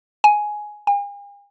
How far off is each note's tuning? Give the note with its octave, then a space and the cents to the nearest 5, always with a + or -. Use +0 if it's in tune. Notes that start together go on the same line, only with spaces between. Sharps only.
G#5 +10
G#5 -45